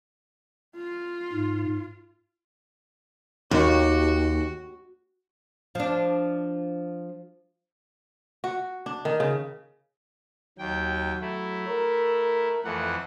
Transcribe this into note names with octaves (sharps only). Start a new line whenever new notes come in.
F4
G#2
D#2 F#4
F3 D4
F#4
D4
D#3
C#3
D#2 F#3 G5
A3 E4
A#4
F2 E3 A3 F#5